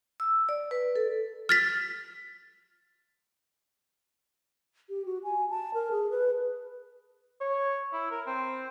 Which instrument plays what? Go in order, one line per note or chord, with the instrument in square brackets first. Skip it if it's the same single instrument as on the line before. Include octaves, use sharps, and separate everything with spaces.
[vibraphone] E6
D5
B4
A4
[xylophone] F6 A6 B6
[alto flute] G4
F#4
G#5
A5
A#4
G#4
B4
[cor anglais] C#5
E4
A#4
C4